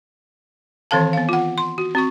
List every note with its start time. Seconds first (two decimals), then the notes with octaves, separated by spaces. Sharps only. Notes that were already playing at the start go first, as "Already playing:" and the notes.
0.91 D#3 E3 C4 A4 F5 A5
1.13 B3 F5
1.29 F4 F#5
1.58 C6
1.78 F#4
1.95 C4 F#4 C#6